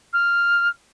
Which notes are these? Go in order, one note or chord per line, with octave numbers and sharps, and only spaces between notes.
F6